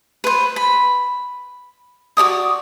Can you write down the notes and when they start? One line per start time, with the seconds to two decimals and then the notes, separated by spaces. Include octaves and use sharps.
0.24 B4 C5
0.56 B5
2.17 F#4 A4 D5 D#6